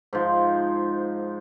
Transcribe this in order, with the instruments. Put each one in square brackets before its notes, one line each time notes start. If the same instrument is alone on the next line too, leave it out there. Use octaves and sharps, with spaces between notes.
[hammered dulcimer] G#2 F3